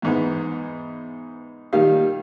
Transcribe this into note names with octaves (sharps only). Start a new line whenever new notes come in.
E2 G#2 B3
A#2 D#3 G3 G4 F5